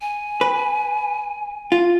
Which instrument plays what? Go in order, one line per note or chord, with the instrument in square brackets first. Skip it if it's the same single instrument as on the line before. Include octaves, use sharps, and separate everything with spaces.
[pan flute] G#5
[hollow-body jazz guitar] B4
F4